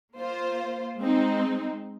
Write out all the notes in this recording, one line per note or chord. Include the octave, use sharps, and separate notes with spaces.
A#3 F4 C5
G#3 C4 D#4